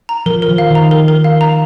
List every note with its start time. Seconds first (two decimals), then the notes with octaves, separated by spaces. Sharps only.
0.09 A#5
0.26 F3 A#4
0.42 A#4
0.48 D#3
0.58 F5
0.70 D#3 A#5
0.91 A#4
1.08 A#4
1.24 F5
1.41 A#5